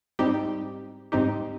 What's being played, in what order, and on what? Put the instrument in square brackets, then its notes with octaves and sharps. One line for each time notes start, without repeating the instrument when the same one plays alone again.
[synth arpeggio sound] G#2 G3 C4 D#4 G4
G#2 G3 C4 D#4 G4